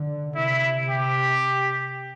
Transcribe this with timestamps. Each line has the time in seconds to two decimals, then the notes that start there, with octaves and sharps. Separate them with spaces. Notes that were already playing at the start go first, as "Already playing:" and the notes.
Already playing: D3
0.35 C3 E4
0.89 G4